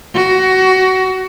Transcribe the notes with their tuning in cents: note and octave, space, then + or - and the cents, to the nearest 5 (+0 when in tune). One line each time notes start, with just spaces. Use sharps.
F#4 +20